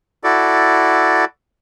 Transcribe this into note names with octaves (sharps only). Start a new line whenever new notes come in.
E4 F#4 A4 D5